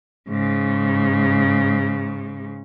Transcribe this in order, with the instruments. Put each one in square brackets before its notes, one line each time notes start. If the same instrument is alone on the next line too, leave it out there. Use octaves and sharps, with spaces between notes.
[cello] G#2 C#3